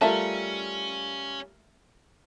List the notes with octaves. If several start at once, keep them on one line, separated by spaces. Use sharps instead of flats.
G3 A3 C#4 F4 A#4 E5 A5